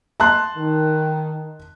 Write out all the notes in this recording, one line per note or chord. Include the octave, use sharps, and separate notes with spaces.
A5 C6 F#6
D#3